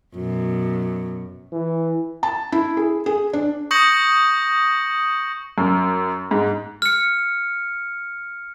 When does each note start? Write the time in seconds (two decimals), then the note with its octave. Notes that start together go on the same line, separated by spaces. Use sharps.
0.15 F#2 B2
1.52 E3
2.23 A5
2.52 E4
2.77 G#4
3.06 G#4
3.33 D4
3.71 C#6 D#6 G6 A#6 C#7 F#7
5.58 F#2
6.31 G#2
6.82 F6 C#7